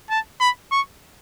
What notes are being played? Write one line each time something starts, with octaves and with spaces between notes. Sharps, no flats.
A5
B5
C#6